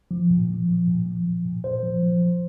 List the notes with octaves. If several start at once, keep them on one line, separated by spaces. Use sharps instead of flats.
F3
A#2
F3
F3
A#2
F3
F3
A#2
A#2 C5
F3
F3
F3